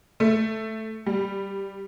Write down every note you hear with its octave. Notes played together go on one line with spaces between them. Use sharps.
A3
G3